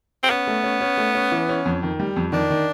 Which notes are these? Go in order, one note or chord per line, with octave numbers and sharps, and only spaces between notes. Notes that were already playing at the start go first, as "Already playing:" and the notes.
C4
B3 C#4
A3
C#4
C#4
A3
C#4
E3
C#4
F2
D#3
G3
F2
D#3 D4
D#3